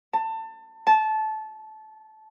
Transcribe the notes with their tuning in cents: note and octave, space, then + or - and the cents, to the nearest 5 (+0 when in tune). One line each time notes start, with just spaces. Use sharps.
A5 +25
A5 -20